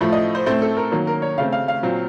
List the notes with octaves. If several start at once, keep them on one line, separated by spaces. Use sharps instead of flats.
A2 F3 A3
D#5
C5
A2 A3 C4 C5
A4
A#4
D#3 F#3 A#3
A#4
C#5
C#3 A3 C4 F5
F5
F5
A#2 F#3 C4